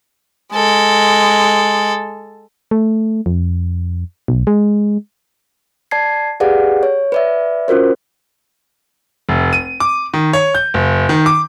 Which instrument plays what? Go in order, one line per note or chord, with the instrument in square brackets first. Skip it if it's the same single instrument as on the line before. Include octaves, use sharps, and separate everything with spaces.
[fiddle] G#3 A4
[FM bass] A3
F2
B1
G#3
[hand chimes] D5 A5 G#6 C7
G4 G#4 B4 D5 F5 F#5
C#5
B4 D5 E5
C#4 F4 F#4 A#4 C5
[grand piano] F1
D#7
D6
D#3
C#5
G6
F#1
D#3
D6